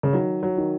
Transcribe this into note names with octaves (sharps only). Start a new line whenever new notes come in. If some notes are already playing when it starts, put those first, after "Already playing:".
C#3
D#3 F#3
F#3
D#3